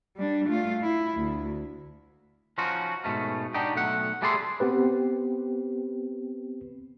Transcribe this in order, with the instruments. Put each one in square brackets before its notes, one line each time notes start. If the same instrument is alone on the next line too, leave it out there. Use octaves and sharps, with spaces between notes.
[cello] G3 D4
A3 F4
E4
D2
[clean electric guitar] F3 C#4 D#4 F4 F#4
G#2 B2 A3 C#4
D4 D#4 F#4 G4 D#5 G5
B1 A3 F#5
G3 A3 G#4 D5 E5 C6
[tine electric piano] B3 C4 G4 B4